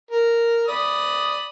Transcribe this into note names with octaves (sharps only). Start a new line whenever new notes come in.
A#4
D5 B5 D#6